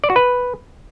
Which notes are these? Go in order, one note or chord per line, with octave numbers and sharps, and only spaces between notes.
D5
F#4
B4